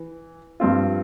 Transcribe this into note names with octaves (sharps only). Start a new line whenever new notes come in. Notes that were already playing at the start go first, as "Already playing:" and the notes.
Already playing: E3
G2 F3 C4 F4